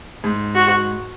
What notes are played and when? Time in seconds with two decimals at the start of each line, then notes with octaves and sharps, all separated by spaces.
0.24 G#2
0.55 F#4